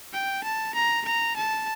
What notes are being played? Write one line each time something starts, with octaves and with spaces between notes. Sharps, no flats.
G5
A5
A#5
A#5
A5